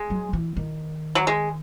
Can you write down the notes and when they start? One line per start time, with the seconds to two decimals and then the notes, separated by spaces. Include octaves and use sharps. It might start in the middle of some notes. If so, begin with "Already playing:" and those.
Already playing: G#3
0.10 F#3
0.33 E3
0.56 D#3
1.15 F#3
1.27 G#3